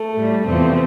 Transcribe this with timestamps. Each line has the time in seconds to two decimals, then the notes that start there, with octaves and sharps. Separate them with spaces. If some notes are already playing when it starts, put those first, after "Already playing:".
Already playing: A3
0.15 A2 G3
0.46 E2 C3 F3 A3 C4